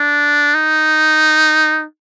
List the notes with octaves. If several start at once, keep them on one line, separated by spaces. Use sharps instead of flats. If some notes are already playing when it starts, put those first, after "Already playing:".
Already playing: D4
D#4